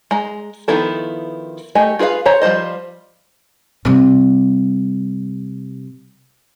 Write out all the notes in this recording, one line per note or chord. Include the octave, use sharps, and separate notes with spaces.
G#3 A#5
D#3 F3 B3 E4 A4
A3 G4 D#5 G#5
F4 G#4 B4 D5 F5
C5 C#5 A#5
F3 G3 C5 D#5
C3 G3